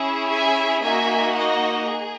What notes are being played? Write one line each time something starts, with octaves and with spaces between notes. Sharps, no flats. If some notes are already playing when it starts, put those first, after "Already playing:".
Already playing: C#4 E4 G#4
E5 G#5
A#3 D#4 F#4 E5 G#5
D#5 F#5
G#4